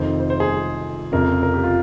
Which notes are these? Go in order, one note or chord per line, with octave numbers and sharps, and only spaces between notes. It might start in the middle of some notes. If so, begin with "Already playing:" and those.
Already playing: F1 F2 D#3 C5
C5
C5
G#4
F1 F2 C#3 A#4
A#4
G4
F4